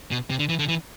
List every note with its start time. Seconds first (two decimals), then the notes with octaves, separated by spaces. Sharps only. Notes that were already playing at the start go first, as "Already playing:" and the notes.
0.11 B2
0.30 C3
0.39 D3
0.49 E3
0.59 D3
0.68 E3